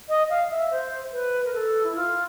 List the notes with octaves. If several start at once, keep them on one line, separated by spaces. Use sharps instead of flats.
D#5
F5
E5
C5
B4
A#4
A4
E4
F4